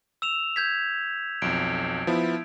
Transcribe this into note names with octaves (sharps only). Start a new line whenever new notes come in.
E6 E7 F7
G6 G#6 B6
B1 F2 D7
F3 B3 E4